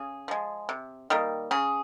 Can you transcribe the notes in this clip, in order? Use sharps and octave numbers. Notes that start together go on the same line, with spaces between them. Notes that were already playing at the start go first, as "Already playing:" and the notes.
Already playing: C#3 G#4
F3 G#3
C3
D#3 G3 A#3
C#3 G#4